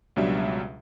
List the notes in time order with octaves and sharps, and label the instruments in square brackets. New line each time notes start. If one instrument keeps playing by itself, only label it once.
[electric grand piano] C#2 B2 F#3 G3 D4 E5